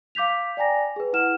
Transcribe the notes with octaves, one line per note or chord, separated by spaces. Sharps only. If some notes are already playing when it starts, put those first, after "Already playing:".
F5 D6 G6 B6 F7
D5 G5 G#5 A#5 A#6
G#4 B4
E4 B4 F#5 F6 E7